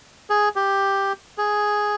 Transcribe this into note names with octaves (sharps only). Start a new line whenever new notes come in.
G#4
G4
G#4